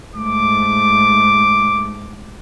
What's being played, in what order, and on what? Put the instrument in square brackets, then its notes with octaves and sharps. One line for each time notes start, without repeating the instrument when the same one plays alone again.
[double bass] G#2 A3 [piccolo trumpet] D6